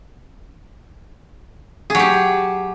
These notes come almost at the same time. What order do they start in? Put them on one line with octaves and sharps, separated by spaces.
G#4 F#3 G4